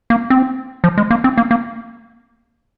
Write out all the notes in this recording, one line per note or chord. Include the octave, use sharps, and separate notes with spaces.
A#3
C4
F3
G#3
A#3
C4
A#3
A#3